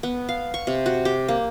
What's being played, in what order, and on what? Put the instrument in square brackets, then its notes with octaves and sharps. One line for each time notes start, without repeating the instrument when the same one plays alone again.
[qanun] B3
F5
C#6
C3
F#4
G4
A#3